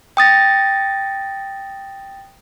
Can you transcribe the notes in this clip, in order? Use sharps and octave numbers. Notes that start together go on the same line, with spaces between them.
G5 D#6 A6 A#6